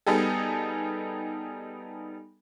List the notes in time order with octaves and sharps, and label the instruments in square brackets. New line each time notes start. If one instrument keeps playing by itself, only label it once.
[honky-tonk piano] G3 B3 D#4 G#4 A4